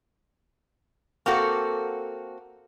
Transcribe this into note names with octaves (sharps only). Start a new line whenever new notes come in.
A#3 C4 F#4 A4